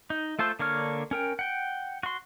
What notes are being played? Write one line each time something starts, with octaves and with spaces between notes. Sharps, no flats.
D#4
A3 F4 A4 C5
D3 A#3 D4 C#5 F6
C#4 A#4 G5
F#5 G5
F#4 C6